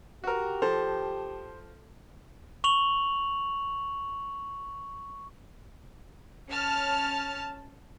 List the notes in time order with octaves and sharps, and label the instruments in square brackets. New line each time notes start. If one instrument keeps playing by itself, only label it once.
[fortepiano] F#4 A#4 [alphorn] G4
[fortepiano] F3 [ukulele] A4 [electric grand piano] C5
[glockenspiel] C#6 F7 F#7
[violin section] C#4 A5 F6